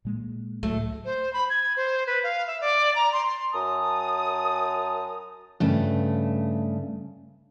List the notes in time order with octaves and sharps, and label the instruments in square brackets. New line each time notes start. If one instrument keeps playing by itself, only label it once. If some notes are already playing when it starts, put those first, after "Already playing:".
[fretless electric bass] A#2 G#3 A#3
[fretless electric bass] C#2 A2 F#3 [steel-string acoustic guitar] A3
[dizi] C5
B5
G#6
C5
B4
F5
E5
D5
A#5
C6
C6
[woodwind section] F#2 A5 A#5 D#6
[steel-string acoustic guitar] G2 C#3 A3